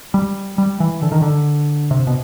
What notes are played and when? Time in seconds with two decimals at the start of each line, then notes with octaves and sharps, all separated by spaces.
0.14 G3
0.58 G3
0.80 E3
1.02 D3
1.12 D#3
1.22 D3
1.91 C3
2.07 B2